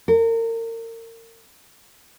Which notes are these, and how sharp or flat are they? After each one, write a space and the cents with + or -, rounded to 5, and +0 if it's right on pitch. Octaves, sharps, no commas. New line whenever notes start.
A#4 -35